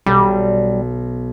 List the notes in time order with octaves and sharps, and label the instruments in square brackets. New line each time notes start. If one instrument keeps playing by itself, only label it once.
[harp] B1 [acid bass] G3